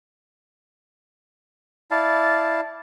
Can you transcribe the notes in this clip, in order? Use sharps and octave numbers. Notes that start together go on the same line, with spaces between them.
E4 D5 F5 A5